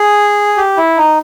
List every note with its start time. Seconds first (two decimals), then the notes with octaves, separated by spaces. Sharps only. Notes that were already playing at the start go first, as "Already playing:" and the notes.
Already playing: G#4
0.57 G4
0.77 E4
0.97 D#4